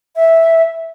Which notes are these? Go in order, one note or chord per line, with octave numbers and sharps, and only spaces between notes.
E5